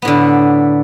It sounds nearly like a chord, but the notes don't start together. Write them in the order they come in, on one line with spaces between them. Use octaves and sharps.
B3 A2 D3